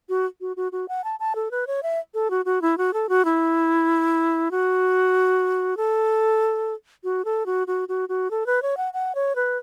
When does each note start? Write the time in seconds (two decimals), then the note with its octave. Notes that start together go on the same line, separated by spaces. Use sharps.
0.09 F#4
0.41 F#4
0.57 F#4
0.72 F#4
0.88 F#5
1.04 A5
1.20 A5
1.35 A4
1.51 B4
1.67 C#5
1.83 E5
2.14 A4
2.30 F#4
2.45 F#4
2.62 E4
2.78 F#4
2.93 A4
3.09 F#4
3.25 E4
4.51 F#4
5.77 A4
7.04 F#4
7.25 A4
7.46 F#4
7.67 F#4
7.89 F#4
8.09 F#4
8.31 A4
8.46 B4
8.62 C#5
8.77 F#5
8.93 F#5
9.15 C#5
9.36 B4